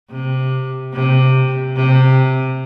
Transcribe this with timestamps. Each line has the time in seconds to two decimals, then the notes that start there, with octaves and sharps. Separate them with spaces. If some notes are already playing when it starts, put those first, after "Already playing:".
0.10 C3
0.93 C3
1.75 C3